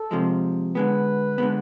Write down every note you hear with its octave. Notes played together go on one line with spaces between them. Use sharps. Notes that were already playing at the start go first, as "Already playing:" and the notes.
Already playing: A4
C3 F3 G#3
D3 G#3 B3 B4
D3 G#3 B3